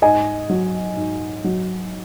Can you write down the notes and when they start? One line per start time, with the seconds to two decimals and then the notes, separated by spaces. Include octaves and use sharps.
0.02 G#2 D#5 G#5
0.50 F#3
0.96 G#2
1.44 F#3